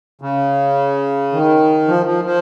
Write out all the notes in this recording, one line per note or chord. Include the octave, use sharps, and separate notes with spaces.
C#3
D#3
F3
F3
F3